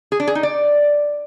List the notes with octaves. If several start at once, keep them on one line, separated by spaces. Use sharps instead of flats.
G#4
D4
G#4
D#4
D5